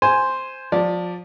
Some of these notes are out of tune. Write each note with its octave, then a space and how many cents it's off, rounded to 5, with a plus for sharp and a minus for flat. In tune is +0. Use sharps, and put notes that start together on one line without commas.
C5 +0 G#5 +0
F3 +25 D5 +0